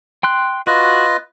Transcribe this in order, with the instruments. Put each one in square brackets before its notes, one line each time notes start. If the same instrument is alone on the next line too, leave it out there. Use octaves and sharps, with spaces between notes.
[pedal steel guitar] G5 C6 F#6
[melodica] F4 B4 D#5 [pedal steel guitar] F#4